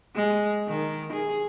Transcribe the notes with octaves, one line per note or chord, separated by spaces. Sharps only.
G#3
D#3
G#4